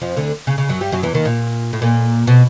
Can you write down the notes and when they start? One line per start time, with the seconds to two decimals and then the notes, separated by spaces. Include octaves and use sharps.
0.01 F2 F3
0.16 D2 D3
0.47 C#3
0.58 C#3
0.69 F#2 F#3
0.81 G2 G3
0.92 F#2 F#3
1.03 E2 E3
1.14 D#2 D#3
1.25 A#2
1.73 A2
1.82 A#2
2.27 B2